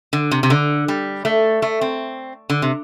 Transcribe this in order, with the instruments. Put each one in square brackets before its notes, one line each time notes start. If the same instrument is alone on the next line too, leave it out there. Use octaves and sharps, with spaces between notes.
[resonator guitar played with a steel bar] D3
C3
C3
D3
G3
A3
A3
C4
D3
C3